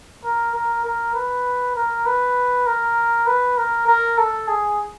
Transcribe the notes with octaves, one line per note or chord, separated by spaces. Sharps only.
A#4
A#4
A#4
B4
A#4
B4
A#4
B4
A#4
A#4
A4
G#4